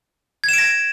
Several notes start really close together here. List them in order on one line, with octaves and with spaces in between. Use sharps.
G#6 E7 D7 A#6